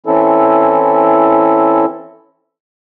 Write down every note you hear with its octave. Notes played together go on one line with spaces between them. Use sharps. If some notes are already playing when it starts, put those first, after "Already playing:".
E3 C4 C#4 E4 A4